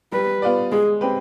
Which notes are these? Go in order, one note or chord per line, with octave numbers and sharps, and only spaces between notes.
G3 B4
B3 F4 B4 D5
G#3 G#4
C4 G4 B4